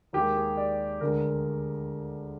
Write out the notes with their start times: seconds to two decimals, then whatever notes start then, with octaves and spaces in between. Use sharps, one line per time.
0.13 D#2 D#3 G#3 G4
0.35 G#4
0.57 D5
1.00 D2 D3 G#3 A#4